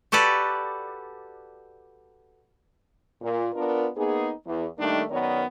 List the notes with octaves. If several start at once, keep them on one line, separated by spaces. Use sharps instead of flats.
F#4 G4 A4 B4 D5
A#2
B3 D4 F4 A#4
A#3 B3 D#4 G#4
E2
D#3 G3 A3 A#3 D4 D#4
F#2 D#3 B3 A#4 C#5 D5